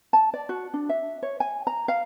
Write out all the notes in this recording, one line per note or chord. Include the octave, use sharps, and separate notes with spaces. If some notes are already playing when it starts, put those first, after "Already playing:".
A5
D5
F#4
D4
E5
C#5
G#5
A#5
F5